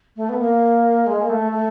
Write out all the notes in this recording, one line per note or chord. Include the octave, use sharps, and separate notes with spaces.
A3
B3
A#3
G#3
A#3
A3
A3